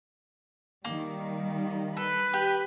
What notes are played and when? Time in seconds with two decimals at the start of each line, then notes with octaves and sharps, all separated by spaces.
0.84 D#3 G3 A#3
1.97 A4 B4
2.33 G4